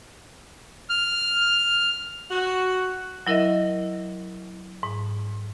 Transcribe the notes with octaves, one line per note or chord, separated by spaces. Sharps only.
F6
F#4
F#3 E4 A#4 D#5 E5
G#2